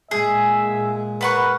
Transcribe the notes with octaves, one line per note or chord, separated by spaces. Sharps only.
A#2 G#3 G#4 E5
A#4 B4 F#5 C#6